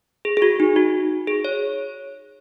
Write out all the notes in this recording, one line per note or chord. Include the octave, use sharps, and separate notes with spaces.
G#4
G#4
F#4
D#4
F#4
G#4
C#5